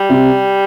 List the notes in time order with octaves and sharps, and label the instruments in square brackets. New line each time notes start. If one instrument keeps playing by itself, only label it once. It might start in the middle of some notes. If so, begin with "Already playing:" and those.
Already playing: [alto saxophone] G3
[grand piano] C3